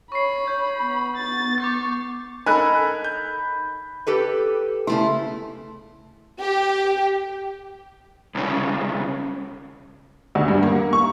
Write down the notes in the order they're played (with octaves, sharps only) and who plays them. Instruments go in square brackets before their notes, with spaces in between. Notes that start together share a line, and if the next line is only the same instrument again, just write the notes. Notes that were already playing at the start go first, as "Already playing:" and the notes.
[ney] C#5 [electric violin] B5 [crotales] C#6 C7
[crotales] G6
[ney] B3
[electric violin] A6
[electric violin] C#6 [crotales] D6 G6 A6
[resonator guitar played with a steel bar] D#4 [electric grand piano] A4 A#4 G#5 [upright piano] B5 F#6
[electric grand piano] G6
[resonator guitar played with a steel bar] G4 A4 B4
[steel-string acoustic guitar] C#3 A3 E4 [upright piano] C6
[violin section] G4
[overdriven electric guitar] C2 C#3
[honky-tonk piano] D2
G2
A#3
C#6